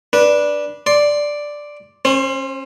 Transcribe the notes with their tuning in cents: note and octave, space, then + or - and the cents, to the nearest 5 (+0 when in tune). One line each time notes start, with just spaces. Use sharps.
D4 +0 B4 -20
D5 +0 C6 +15
C#4 -30 C5 +20